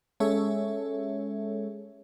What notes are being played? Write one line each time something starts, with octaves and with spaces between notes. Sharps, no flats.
G#3 C#4 G#4 A4 C#5 E5